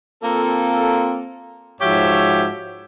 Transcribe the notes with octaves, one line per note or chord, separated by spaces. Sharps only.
A#3 C4 F4 A4
G#2 F3 F#4 G4 C#5 E5